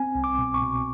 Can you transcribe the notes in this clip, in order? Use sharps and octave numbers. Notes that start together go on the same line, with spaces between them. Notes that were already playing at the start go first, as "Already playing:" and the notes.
Already playing: C4 G#5
C2
D6
B2
C#6
B2